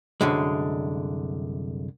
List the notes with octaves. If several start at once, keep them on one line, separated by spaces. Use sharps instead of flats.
C2 F#2 D3 G#3